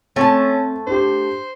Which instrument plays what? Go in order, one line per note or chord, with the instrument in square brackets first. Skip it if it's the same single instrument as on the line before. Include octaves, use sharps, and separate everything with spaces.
[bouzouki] A3 A5 [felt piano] C4 [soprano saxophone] C#4
[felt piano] D4 G4 [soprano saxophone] C5